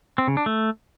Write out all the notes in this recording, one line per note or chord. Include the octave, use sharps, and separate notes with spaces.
C4
C#3
D4
A3